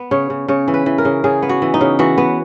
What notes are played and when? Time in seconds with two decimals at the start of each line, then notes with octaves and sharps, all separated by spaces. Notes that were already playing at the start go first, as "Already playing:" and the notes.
Already playing: B3
0.11 C#3 C#5
0.30 C#3
0.48 C#3 C#5
0.68 E3
0.74 B4
0.86 E3
0.98 A#4
1.05 C#3
1.24 C#3 G#4
1.42 B3
1.49 F#4
1.62 E3
1.74 D#4
1.81 C#3
1.99 E3 F#4
2.18 B3